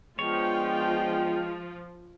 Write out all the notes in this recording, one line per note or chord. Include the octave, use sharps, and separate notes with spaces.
F3 G#3 B3 D4 F4 C#5 G5